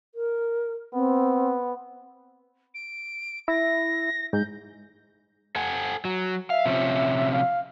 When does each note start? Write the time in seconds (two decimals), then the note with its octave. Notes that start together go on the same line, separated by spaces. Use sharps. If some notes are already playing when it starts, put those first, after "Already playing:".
0.15 A#4
0.94 B3 C4
2.74 D7
3.48 E4 A#6
4.33 G#2 G6
5.56 A4 F#5 G#5
6.05 F#3
6.50 E5 F5
6.66 C3 F3 C#4
7.32 F5